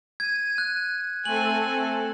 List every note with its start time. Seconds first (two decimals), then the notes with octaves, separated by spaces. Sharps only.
0.20 G#6 D#7
0.58 F#6
1.25 A3 C4 A4 G#5 F#7